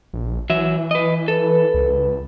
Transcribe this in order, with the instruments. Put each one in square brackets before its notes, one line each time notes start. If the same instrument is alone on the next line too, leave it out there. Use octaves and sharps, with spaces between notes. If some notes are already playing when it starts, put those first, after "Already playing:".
[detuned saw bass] A#1
[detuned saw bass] E3 [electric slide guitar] F#3 E5
[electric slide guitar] B4 D#5
[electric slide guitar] A4 [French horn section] B4
[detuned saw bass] C#2